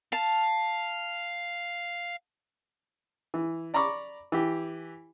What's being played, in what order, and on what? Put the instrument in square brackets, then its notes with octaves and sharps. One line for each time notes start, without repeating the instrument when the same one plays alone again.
[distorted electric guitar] F5 [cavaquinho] A5
[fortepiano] E3
D5 A#5 B5 C#6 D6
E3 G4